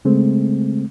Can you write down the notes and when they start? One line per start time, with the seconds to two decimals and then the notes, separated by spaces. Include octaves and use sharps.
0.05 C#3 G#3 A3 C4